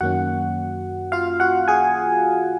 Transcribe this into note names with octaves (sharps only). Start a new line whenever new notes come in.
F#2 D#3 A#3 C#4 F#4 F#5
F4 F5
F#4 F#5
G#4 G#5